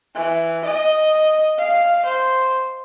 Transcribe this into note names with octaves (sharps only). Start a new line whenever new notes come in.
E3
D#5
F5
C5